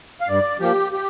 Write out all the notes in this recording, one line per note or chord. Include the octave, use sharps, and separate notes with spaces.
F5
G2 D5
F3 A#3 G4
G4